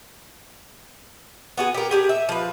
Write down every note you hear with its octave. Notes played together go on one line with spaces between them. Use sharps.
B3 F#4 G#4
G4 A#4
D4 G4 G#4
E5
F3 B4